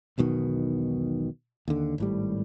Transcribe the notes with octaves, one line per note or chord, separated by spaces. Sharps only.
E1 B1 B2 D#3
D#2 D3
G#1 A2 G3